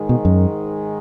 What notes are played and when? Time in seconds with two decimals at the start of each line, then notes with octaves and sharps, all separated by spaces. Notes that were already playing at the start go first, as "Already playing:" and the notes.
Already playing: G#2 D#3 G#3
0.09 B2
0.25 F#2